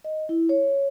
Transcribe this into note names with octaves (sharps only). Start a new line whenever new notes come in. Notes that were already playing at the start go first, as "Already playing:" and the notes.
D#5
E4
C#5